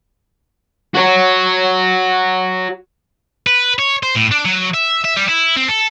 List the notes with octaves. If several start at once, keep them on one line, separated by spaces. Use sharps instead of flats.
F#4 C#5
B4
C#5
C5
A2
D4
F#3
E5
E5
G3
E4
C4
A4